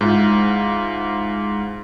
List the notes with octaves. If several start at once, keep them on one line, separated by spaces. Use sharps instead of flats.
G#2 E4 F4 F5